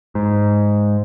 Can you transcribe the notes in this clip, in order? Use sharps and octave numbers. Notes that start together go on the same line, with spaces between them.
G#2